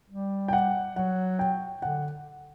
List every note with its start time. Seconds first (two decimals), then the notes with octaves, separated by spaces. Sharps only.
0.10 G3
0.48 G5
0.53 F#5
0.96 F#3 F#5
1.39 G5
1.82 D3 F#5